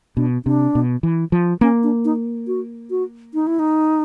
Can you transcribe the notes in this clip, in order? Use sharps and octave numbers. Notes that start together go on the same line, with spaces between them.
B2 D4
C3 D4
B2
E3
F3
A#3 C#4
D4
D#4
F#4
F#4
D#4
E4
D#4